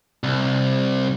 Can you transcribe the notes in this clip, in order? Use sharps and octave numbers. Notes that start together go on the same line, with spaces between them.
C2